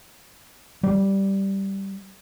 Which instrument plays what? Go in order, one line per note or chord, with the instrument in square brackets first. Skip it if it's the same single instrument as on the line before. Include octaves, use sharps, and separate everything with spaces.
[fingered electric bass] G3